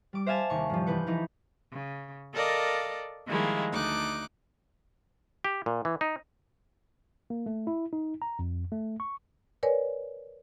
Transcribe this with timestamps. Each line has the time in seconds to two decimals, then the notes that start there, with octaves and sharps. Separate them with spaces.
0.13 G3 D6
0.26 C5 E5 F5 G#5 A5
0.50 D#2 C3 C#6
0.70 G2 F3
0.86 F1 E3 B4 G6 C#7
1.07 E3 F3 D#4 E4
1.72 C#3
2.33 A4 A#4 D5 D#5 F5
3.27 D#3 F3 G3 G#3 A#3 E4
3.72 D2 D#4 D6 F#6
5.44 G4
5.66 A#2
5.85 E3
6.01 D#4
7.30 A#3
7.46 A3
7.67 E4
7.93 D#4
8.22 A#5
8.39 F2
8.72 A3
9.00 C#6
9.63 A#4 B4 C#5 D5 G#5